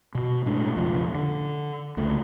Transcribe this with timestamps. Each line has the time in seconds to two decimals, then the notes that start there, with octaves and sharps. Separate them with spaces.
0.15 B2
0.46 A2 G#3 A3 D4
0.75 B1 F2 C#3 F3
1.15 D3
1.97 C#2 D3 A3